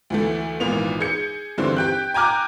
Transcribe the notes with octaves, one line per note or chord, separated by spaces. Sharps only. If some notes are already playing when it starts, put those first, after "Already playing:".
D2 E3 A3
G#1 A#2 E3 B3 F7
G#4 G6 C#7
G2 D3 E3 C4
G4 G5 F#6
G5 G#5 A#5 D6 F6 F#6